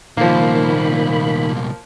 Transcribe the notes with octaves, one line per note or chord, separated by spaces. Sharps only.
C2 A#2 D#3 F3 A#3 B5